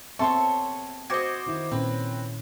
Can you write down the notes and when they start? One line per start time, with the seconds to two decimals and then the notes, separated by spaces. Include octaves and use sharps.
0.19 B3 C4 A4 C#5 E5 C6 C#6
1.10 F#4 C5 D#5 D6 G#6
1.47 D#3 E4
1.71 A#2 C4 C#4 B4